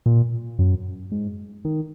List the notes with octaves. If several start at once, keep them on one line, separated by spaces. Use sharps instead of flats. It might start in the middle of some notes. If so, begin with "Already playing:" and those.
A#2
F#2
G#2
D#3